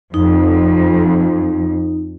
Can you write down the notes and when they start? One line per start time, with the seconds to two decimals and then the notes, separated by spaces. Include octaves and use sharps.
0.14 F2 D#4